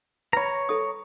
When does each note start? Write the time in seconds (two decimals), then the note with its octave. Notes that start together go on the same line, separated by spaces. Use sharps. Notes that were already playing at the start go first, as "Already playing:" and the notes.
0.33 B4 C#5 A#5 B5
0.69 A4 D#6